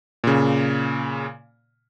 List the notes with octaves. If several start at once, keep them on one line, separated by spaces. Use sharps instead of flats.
A#2 C#3